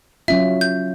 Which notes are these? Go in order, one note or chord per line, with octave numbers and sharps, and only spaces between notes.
F#3 C#4 F4 E5
G6